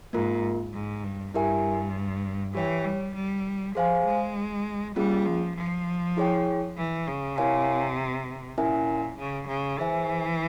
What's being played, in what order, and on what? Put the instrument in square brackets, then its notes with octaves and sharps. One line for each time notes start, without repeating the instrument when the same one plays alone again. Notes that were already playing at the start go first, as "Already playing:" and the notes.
[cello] G#2 [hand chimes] A#3 F4 A#4
[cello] G#2
G2
[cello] G2 [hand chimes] E4 G4 A#4 E5 G#5
[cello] E3 [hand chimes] G4 C#5 G5
[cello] G3
G3
[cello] F3 [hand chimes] G#4 C5 F5 G#5
[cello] G#3
[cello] G3 [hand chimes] A#3 C#4 F4 G#4
[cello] F3
F3
[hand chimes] E4 G#4 C#5 G5
[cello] E3
C#3
[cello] C3 [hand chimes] E4 A#4 C#5 F5 G#5
[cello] A#2 [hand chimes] C#4 E4 A#4 E5 G#5
[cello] C#3
C#3
[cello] E3 [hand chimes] G#4 C5 E5 G#5